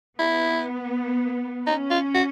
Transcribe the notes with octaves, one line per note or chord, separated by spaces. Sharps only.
B3 E4
C#4 D#4
F4
F#4